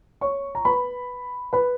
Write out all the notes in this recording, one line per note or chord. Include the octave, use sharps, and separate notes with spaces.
C#5 C#6
A#5
B4 B5
B4 B5